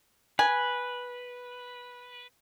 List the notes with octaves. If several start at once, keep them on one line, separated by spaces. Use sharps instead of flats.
B4 G#5